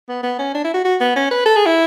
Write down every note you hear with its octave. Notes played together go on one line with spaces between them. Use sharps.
B3
B3
C#4
D4
E4
F#4
F#4
B3
C#4
B4
A4
G#4
E4